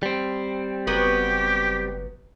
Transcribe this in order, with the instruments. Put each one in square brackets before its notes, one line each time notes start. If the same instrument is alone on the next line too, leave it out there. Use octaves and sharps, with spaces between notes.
[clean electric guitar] G3 C4
[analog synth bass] F#1 [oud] F#3 B3 B4 [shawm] G4